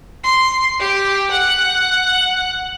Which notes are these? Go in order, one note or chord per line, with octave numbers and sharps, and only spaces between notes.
C6
G4
F#5